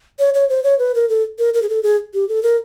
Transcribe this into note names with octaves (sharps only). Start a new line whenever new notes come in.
C#5
C#5
C5
C#5
B4
A#4
A4
A#4
A#4
G#4
A4
G#4
G4
A4
A#4